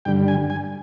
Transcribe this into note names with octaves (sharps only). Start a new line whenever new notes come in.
G2 D3 G3 G5
G#5
G#5